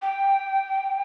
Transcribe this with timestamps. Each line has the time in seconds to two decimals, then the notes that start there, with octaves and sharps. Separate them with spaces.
0.02 G5